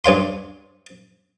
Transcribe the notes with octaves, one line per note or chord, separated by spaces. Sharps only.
G2 C#5 F5 C6